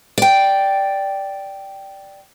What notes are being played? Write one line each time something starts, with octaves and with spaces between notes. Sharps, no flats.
D5 G5